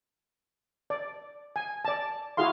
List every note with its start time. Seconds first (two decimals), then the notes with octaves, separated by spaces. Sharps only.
0.90 D5
1.56 G#5
1.85 D5 A5
2.37 E4 F#4 G#4 F5 C6